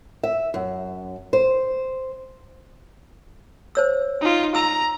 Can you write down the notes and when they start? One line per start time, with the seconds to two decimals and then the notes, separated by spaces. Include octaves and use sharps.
0.23 E5
0.54 F#2
1.33 C5
3.75 C5 C#5 E6
4.21 D#4 F4
4.55 A#5 E6